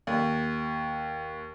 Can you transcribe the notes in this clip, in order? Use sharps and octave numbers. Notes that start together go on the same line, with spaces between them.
D#2